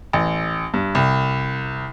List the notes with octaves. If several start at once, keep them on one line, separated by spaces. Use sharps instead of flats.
A1
G2
C2